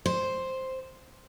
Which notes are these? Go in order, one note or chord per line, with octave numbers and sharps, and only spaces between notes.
C5